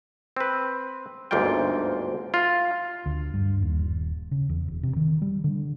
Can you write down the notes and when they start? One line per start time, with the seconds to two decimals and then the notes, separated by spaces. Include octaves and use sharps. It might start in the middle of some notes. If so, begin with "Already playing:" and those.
0.37 C4 B4
1.31 G1 D2 G#2 A#3 F4 G5
2.34 F4
3.06 D2
3.34 G2
3.62 D#2
3.79 D#1
4.31 C#3
4.49 E2
4.68 E1
4.83 C3
4.96 D#3
5.22 G3
5.44 D3